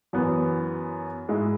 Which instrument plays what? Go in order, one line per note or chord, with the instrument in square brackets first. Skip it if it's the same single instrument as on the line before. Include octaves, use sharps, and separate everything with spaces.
[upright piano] F#2 E3 B3
G#2 G#3 E4